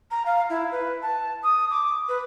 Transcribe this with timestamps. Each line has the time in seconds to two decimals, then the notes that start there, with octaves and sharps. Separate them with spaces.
0.11 A#5
0.26 F5
0.50 E4
0.72 B4
1.02 A5
1.43 D#6
1.71 D6
2.09 B4